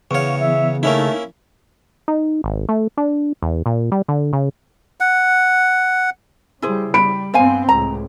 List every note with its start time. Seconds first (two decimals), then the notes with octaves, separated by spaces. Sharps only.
0.11 E2 C#3 C#5 F5 C#6
0.41 E3 B3 E5
0.83 A3 A#3 C#4 D#4 E4
2.08 D#4
2.44 G#1
2.69 A3
2.97 D4
3.42 E2
3.66 A#2
3.92 G3
4.08 D3
4.33 C#3
5.00 F#5
6.62 C#3 G3 E4 G#4 C5
6.94 G3 B5 D7
7.34 G2 B3 C4 C5 F5 G#5
7.69 C#2 A2 A#5